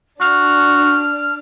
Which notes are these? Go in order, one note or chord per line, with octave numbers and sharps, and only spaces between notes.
D4 F#4 F6